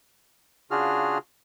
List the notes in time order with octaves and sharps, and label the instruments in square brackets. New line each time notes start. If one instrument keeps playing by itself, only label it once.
[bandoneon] C#3 D4 F4 F#4 G#4 F6